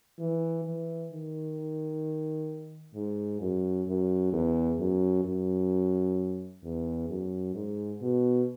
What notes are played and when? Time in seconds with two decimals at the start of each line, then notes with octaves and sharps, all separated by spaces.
0.19 E3
0.65 E3
1.12 D#3
2.95 G#2
3.41 F#2
3.88 F#2
4.33 E2
4.79 F#2
5.25 F#2
6.64 E2
7.09 F#2
7.55 G#2
8.01 B2